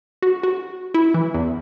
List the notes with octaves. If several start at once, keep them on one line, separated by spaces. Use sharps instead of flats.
F#4
F#4
E4
E3
E2